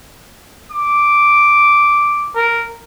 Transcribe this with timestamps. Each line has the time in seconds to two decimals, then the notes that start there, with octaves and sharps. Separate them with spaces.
0.71 D6
2.35 A#4